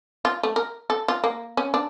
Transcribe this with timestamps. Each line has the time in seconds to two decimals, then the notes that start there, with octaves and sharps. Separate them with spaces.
0.25 F4
0.43 A3
0.56 A#4
0.90 A4
1.08 F4
1.24 A#3
1.57 C#4
1.74 D4